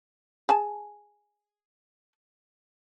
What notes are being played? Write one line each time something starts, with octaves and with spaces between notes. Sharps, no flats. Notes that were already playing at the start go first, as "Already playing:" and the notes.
G#4 G#5 A5